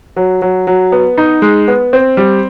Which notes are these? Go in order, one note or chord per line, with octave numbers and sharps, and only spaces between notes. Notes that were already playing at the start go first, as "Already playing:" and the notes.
F#3
F#3
F#3
B3
D#4
G#3
B3
C4
G3